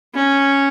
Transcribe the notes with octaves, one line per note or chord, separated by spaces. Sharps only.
C#4